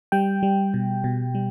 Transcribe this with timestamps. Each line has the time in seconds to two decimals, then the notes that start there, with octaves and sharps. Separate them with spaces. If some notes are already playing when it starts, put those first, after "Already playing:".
0.12 G3 G5
0.43 G3
0.74 B2
1.04 B2
1.35 G3